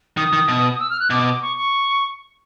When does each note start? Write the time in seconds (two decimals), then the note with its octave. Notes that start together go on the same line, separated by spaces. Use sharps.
0.17 D#3 D#6
0.33 D#3
0.48 B2
0.80 E6
0.90 F6
1.00 F#6
1.10 B2 D6
1.42 C#6
1.57 C#6